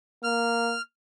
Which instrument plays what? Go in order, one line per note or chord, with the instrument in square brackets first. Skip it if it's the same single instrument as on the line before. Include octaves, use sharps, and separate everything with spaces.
[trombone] A#3 [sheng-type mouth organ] F6